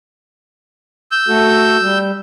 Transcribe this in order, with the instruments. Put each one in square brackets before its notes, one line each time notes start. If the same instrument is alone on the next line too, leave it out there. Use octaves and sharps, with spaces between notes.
[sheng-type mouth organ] E6 G6
[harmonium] A3 F#4 A4
G3